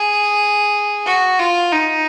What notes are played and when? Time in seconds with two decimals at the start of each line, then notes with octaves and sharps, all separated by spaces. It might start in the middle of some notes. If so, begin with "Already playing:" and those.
Already playing: G#4
1.06 F#4
1.39 F4
1.73 D#4